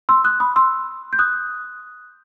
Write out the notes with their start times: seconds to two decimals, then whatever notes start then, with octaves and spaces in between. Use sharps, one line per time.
0.09 C6 E6
0.24 D#6 F#6
0.40 B5 D#6
0.56 C6 E6
1.13 G6
1.19 D#6 F#6